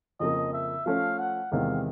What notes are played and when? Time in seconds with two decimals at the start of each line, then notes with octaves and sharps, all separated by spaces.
0.20 F2 C#3 F3 A#3 D#5
0.53 E5
0.86 F3 A3 C#4 F5
1.19 F#5
1.52 E2 C3 D#3 G#3 F5